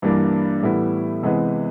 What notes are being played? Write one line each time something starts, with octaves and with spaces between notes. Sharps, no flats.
G2 E3 G3 A#3 D4
A2 E3 G3 B3 E4
C3 E3 G#3 B3